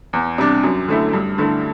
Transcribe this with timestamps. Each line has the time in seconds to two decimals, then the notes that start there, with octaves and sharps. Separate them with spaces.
0.13 E2
0.38 C3 G3 D4
0.63 F#2
0.88 D3 A3 E4
1.13 G2
1.38 D3 A3 E4